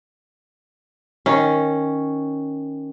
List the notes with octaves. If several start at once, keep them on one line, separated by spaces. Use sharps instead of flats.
D#3 C#4